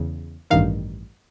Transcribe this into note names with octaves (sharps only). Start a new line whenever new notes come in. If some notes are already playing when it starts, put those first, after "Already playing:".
Already playing: E2 C#3
A1 G2 D#3 F5